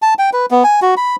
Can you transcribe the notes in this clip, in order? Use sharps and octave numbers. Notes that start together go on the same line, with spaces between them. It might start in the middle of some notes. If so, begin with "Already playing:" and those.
A5
G5
B4
B3
G#5
F#4
B5